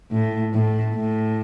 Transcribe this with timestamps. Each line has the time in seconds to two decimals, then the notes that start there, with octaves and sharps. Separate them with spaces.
0.11 A2
0.53 A2
0.95 A2